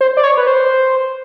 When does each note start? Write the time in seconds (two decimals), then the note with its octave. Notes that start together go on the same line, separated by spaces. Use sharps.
0.01 C5
0.17 D5
0.23 C#5
0.37 B4
0.47 C5